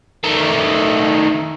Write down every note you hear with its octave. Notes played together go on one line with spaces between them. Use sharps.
D#3 A3